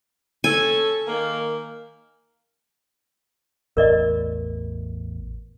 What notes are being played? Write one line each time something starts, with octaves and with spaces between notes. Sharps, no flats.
C#4 A4 G#5
D#3 A#3
A1 E2 A#4 D5 D#5